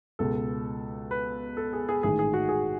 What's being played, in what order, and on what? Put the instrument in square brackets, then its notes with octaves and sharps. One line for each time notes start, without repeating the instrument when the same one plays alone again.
[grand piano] C#2 B2 A4
B4
A4
G#4
G#4
A1 G#2 D#3 G#4
G#4
F#4
G#4